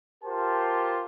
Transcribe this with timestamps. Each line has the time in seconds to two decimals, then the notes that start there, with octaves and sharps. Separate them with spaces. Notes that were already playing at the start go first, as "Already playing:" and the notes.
0.24 F4 G4 A#4 C5 A5